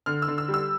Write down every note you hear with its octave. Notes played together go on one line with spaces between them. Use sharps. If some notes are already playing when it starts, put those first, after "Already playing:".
D3 F6
E6
D3
E6
G3
E6